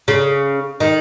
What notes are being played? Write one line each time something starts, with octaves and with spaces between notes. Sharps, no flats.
C#3
D#3